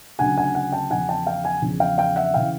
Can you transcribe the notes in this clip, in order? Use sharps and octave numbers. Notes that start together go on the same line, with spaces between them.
D2 C#3 F#3 F#5 G#5
F#5 G#5
F#5 G#5
G5 A5
E2 C#3 F3 F#5 G#5
G5 A5
F5 G5
F#5 G#5
E2 C#3 F3
F5 G5
F5 G5
E5 F#5
C#3 E3 F5 G5